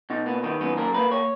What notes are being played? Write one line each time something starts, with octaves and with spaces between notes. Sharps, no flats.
B2 D#4
A#3 B3
D#3 B3
F#2 B3
A#3 A#4
A#3 B4
C#5